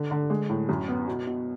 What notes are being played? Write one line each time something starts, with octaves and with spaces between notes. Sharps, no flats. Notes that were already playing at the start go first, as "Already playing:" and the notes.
Already playing: D3
D3
G#3
A2
F#2
B3
B2
B2